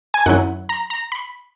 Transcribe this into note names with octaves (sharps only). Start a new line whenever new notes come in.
G#5
F#2 D#3 F#3 C#4 E4 F#5
A#5
A#5
B5